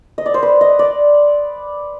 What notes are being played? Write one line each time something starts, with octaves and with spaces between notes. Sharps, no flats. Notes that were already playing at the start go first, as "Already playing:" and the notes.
D#5
D5
C5
B4
D#5
D5